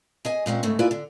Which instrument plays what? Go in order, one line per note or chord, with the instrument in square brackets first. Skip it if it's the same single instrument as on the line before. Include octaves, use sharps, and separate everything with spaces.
[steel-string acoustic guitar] G#4 D#5 G#5
A#2 G#3 C4 C#4
G#2 C#3 A3
A#3 E4 F4 G#4 B4 D5
D3